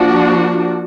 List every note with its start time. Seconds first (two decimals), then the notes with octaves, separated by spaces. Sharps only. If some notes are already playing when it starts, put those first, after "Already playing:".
Already playing: F3 A#3 D4 F#4